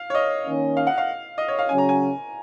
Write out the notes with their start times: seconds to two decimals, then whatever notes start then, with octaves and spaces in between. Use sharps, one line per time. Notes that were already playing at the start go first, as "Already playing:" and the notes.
Already playing: F5
0.10 C#5
0.15 D#5
0.45 D#3 A#3 C#4
0.77 F5
0.87 F#5
0.98 F5
1.38 D#5
1.48 C#5
1.59 F5
1.68 C#3 F#3 C#4 G#5
1.78 A#5
1.89 G#5